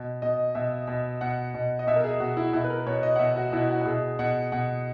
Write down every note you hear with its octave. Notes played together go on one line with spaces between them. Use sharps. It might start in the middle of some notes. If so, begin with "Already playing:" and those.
Already playing: B2
B2 D#5
B2 E5
B2
B2 F#5
B2
D#5
B2 E5
A#4
G#4
B2 F#4
E4
B2 E4
B4
A#4
B2 C#5
D#5
F#5
B2 E5
F#4
B2 E4
F#4
F#4
B2 G#4
B2 F#5
B2 F#5